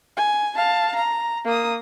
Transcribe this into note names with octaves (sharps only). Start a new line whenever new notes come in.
G#5
F5 A5
A#5
A#3 D#6